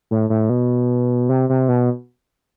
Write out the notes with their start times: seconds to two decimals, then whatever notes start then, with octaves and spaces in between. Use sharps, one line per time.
0.11 A2
0.30 A2
0.49 B2
1.29 C3
1.49 C3
1.69 B2